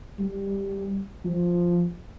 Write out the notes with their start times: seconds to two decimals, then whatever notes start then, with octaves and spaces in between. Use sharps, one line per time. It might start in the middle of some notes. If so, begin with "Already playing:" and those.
0.19 G3
1.25 F3